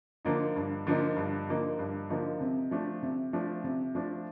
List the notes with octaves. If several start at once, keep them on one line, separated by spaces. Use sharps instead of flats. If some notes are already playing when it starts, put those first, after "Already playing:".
D3 F3 A#3 D#4
G2
D3 F3 A#3 D#4
G2
D3 F3 A#3 D#4
G2
D3 F3 A#3 D#4
C3
F3 A3 D4
C3
F3 A3 D4
C3
F3 A3 D4